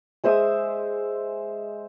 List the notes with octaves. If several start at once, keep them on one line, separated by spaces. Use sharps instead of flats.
G#3 C5 E5 D#6